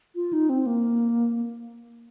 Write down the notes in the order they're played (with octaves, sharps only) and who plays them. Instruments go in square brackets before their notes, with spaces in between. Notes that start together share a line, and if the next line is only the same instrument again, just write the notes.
[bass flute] F4
D#4
C4
A#3